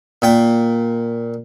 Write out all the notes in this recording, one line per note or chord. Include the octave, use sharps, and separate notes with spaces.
A#2 G5